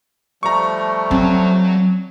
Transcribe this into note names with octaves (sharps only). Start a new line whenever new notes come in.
F3 G3 A3 A#5 C#6
F#3 C4 C#5